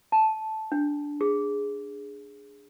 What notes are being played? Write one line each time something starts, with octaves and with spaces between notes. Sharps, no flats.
A5
D4
G#4